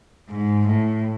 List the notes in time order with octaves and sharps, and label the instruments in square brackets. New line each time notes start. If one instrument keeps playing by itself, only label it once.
[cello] G#2
A2